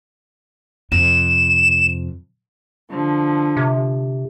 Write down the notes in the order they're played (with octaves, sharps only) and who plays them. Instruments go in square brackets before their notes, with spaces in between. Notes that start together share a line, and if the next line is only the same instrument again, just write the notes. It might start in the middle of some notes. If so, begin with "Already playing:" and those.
[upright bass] F2 C3 [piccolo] E7
[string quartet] D3 F3
[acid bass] C3